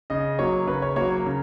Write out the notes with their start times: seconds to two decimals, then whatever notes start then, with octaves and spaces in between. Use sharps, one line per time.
0.10 C#3 D#5
0.39 F#3 A#3 C#5
0.67 C#3 B4
0.82 C#5
0.96 F#3 A#3 C#5
1.11 C#5
1.26 C#3